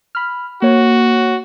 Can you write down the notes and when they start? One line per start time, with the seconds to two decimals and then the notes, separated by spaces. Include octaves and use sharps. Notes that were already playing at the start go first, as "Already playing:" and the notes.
0.15 B5 F6
0.62 A#3 F#4 C#5